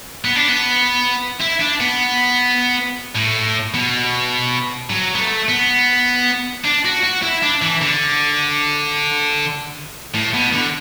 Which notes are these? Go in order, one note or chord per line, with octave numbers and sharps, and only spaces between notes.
B3
D4
B3
E4
D4
B3
A2
B2
F#3
B3
A3
B3
D4
F#4
F#4
E4
D4
E3
D3
A2
B2
D3